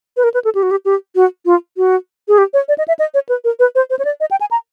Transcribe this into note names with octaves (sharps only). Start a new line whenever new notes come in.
B4
A#4
B4
A4
G4
F#4
G4
G4
F#4
F4
F#4
G#4
G4
C#5
D5
D#5
E5
D#5
C#5
B4
A#4
B4
C5
C5
C#5
D5
D#5
G5
G#5
A#5